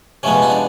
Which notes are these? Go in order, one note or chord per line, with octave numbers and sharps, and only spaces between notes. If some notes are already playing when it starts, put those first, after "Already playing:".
C3 F3 G#3 B3 C#4
D#4
D4